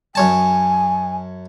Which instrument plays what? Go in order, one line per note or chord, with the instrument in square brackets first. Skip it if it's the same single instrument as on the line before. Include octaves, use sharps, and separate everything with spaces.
[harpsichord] F#2 C#5 A5 [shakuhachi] G#5